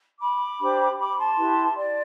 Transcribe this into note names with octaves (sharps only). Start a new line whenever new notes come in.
B5 D6
D4 G4 C5
B5 D6
A5 C6
E4 G4 B4
D5